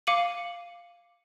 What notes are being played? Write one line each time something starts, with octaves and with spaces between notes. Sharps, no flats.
F5 D6 C#7 D#7 F#7